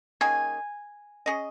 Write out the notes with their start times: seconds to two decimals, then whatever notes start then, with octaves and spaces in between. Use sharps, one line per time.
0.21 D#3 A#3 C#4 G#4 G#5
1.26 C#4 G#4 D#5